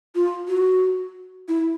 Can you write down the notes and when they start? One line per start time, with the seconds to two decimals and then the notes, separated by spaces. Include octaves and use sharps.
0.15 F4
0.48 F#4
1.49 E4